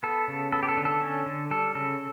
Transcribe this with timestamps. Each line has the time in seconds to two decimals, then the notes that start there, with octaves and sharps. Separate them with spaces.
0.03 B3 A4
0.28 C#3
0.52 B3 A4
0.63 G4
0.69 A4
0.77 D3
0.85 A4
1.02 C#4
1.26 D3
1.51 G3 A4
1.75 C#3 A4